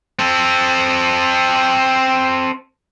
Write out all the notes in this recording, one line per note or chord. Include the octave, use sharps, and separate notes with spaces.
C4 A4